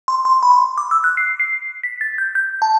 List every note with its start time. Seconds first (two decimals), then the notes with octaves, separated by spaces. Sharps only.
0.08 C6
0.25 C6
0.43 B5
0.52 C6
0.78 D6
0.91 E6
1.04 F#6
1.17 C7
1.40 C7
1.83 B6
2.01 A6
2.18 G6
2.35 G6
2.62 A5